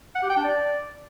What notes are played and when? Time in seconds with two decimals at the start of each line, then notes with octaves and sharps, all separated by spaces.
0.15 F#5
0.22 G4
0.30 G5
0.37 D4
0.44 D5